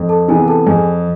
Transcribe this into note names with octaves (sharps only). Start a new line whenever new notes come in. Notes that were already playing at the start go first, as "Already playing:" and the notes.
Already playing: F2
A4 A5
C3 E3 B3 G#4 G#5
A4 A5
F2 G#4 G#5